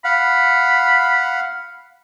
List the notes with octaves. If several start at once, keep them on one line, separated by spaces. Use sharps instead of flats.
F5 F#5 B5